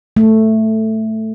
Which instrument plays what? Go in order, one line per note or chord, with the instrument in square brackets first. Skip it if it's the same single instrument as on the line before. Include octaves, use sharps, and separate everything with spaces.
[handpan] A3